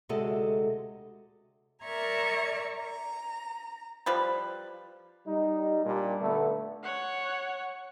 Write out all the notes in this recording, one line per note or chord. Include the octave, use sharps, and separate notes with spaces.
D2 C3 G#3 F#4 A4 D#5
A#4 D5 E5 A#5 C#6 G#6
A#5
F3 G3 B4
G3 D#4
A#2 G3 D4
D3 A3 B3
C#5 F#5